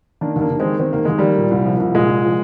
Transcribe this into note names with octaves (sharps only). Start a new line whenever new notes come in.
D#3 A#3 D4
D#2 A#3 D4
D#2
G#3 C4
D#3
D#3 C4
D#2 A#3
D#2 G#3
D#3 G3 A#3
A#2
C2
F3
C2
A#2 G#3
C2
F3